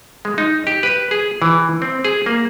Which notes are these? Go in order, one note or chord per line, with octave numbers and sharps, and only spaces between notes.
G#3
D#4
G4
B4
G#4
E3
C4
G#4
A#3